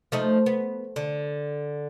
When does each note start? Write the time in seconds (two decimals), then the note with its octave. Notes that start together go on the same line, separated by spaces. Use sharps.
0.12 F3 A3 D#4
0.46 B3
0.96 D3